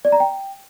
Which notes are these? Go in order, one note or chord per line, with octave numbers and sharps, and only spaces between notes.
D5
A#5
G5